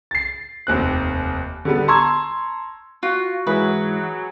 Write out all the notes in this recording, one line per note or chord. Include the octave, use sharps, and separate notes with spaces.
A6 C7
F1 D#2 C4 F#6
D3 G3 B3
A5 A#5 C6 C#6 E6 G#6
F4 F#4
G#2 E3 F#3 E4 G#4 B4